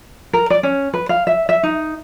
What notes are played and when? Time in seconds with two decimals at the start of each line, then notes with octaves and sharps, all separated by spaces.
0.33 A#4
0.50 D5
0.63 C#4
0.94 B4
1.09 F5
1.27 E5
1.49 E5
1.63 D#4